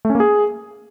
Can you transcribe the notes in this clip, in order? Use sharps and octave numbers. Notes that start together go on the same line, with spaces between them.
A3
C#4
A#3
G#4